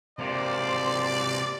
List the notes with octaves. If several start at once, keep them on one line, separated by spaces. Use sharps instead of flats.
C3 A#3 C5 D5